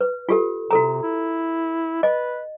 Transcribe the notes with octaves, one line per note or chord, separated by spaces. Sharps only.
B4
F4 G4 A4
C3 F#4 A4 A#5
E4
B4 D#5